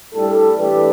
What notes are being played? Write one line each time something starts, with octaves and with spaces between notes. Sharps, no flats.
A2 G3 D4 A4
E3 A3 D4 G4 B4